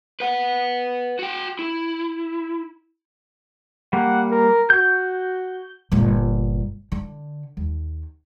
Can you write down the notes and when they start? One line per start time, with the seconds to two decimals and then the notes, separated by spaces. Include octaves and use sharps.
0.20 B4 F#5
1.19 F#4 G5
1.59 E4
3.93 G3 A#3 F#5
4.31 A#4
4.70 F#4 G6
5.92 G1 A#2
6.92 D3
7.57 D#2